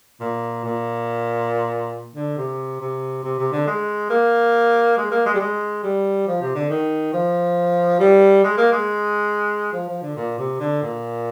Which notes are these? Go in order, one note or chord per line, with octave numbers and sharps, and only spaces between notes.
A#2
A#2
D3
C3
C3
C3
C3
D3
G#3
A#3
G#3
A#3
G#3
G3
G#3
G3
F3
C3
D3
D#3
F3
G3
G#3
A#3
G#3
F3
F3
D3
A#2
C3
D3
A#2